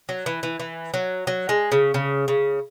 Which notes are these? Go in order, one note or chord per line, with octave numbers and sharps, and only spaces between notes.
F#3
E3
E3
E3
F#3
F#3
G#3
C#3
C#3
C#3